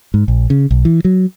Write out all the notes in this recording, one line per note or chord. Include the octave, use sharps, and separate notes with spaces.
G#2
A#1
C#3
B1
E3
F#3